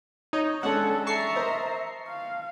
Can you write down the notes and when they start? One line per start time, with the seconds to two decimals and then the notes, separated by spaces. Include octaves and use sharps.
0.33 D#4 C#5
0.63 G#3 C#4 D4 A4 F#5
1.06 E5 A5 A#5 C#6 C7
1.35 A#4 C5 D#5
2.08 F5